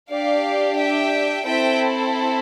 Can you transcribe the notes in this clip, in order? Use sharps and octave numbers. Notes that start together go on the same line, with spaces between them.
D4 G4 D5 F5
E5 G5
C4 E4 A4 E5 G5